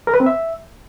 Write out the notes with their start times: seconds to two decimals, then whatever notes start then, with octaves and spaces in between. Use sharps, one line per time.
0.07 A#4
0.14 B4
0.20 C4
0.26 E5